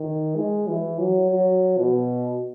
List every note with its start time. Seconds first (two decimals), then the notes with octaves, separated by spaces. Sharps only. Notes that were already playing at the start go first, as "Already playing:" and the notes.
Already playing: D#3
0.35 G#3
0.68 E3
0.99 F#3
1.30 F#3
1.78 B2